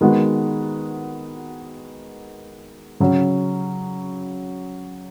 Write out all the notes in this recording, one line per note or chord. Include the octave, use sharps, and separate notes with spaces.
D#3 G#3 B3 F#4
C#3 F#3 C#4